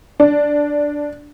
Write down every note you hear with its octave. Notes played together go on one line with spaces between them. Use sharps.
D4